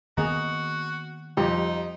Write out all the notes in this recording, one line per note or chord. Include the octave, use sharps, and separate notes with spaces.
D#3 A#3 B3 F#4 G#4 D#5 A#5
F2 G3 D#4 G4